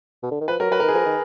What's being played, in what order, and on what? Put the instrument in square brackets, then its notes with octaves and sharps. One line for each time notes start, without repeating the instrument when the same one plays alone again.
[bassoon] B2
D3
D#3
[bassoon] F3 [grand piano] B4
[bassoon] F#3 [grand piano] A#4
[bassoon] F#3 [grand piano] B4
[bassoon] D#3 [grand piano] A#4
[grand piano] G#4
[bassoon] F3 [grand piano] A#4
[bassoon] D#3